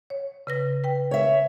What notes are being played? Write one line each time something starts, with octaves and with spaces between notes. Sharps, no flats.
C#5
C#3 B4 A#6
B4 G5
C#5 E5